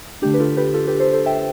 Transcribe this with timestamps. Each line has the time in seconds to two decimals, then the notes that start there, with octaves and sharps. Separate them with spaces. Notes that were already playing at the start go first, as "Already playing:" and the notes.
0.22 D3 A3 D4 G4
0.34 B4
0.40 F4 A4
0.57 G4 B4
0.74 F4 A4
0.87 G4 B4
1.00 A4 C5
1.13 A4 C5
1.26 E5 G5